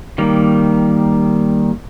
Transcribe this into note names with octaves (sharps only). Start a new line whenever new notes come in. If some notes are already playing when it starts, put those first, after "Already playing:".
D#3 G3 A#3